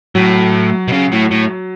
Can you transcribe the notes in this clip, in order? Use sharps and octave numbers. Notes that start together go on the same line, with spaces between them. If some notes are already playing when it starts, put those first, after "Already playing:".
A2 F#3
B2
C#3
A2
A2